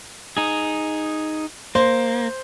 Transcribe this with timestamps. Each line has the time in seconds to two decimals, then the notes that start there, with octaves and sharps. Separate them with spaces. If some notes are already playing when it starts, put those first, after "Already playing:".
0.37 D#4 G#4
1.75 A#3 C5